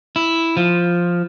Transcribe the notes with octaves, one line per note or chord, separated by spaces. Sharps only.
E4
F3